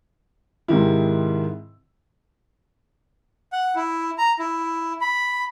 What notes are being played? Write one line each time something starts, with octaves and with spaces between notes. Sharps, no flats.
G#2 C3 D#3 E4
F#5
E4
A#5
E4
B5